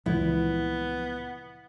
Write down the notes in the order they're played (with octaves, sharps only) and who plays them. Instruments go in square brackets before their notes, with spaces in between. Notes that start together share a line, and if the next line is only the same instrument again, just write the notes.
[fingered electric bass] C#2 A#2 E3 [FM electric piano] F3 [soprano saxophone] B3 [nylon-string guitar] E4